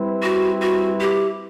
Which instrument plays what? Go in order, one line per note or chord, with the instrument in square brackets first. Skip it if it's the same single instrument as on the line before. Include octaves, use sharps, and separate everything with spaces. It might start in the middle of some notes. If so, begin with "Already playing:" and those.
Already playing: [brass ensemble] G3 C4 E4 B4
[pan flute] F#4
F#4
G4